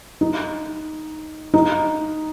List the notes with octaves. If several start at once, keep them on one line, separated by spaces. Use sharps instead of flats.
D#4
D#4